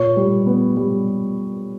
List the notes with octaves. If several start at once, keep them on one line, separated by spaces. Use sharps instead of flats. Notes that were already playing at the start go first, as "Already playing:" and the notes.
Already playing: A#2 C#5
G3
B3
G3